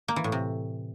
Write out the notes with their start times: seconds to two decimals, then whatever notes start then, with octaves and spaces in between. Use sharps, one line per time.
0.08 A#3
0.16 E3
0.24 A2
0.32 C3